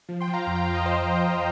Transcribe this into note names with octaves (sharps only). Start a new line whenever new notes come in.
F3
G5 C6
F3
F5 A#5
F2 A#5
G5
F2 F5
D#5 G5
C5 F5